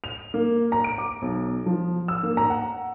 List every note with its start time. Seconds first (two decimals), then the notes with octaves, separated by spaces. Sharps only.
0.04 F7
0.34 A#3
0.72 A#5
0.84 D7
0.98 D6
1.22 B1
1.66 F3
2.08 E6
2.23 A#3
2.37 A#5
2.50 F#5